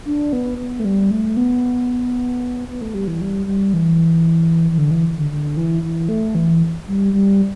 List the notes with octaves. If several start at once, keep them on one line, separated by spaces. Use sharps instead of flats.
D4
B3
B3
A3
G3
A3
B3
B3
A3
G3
E3
G3
G3
E3
E3
D3
E3
D3
D3
E3
E3
A3
E3
G3
G3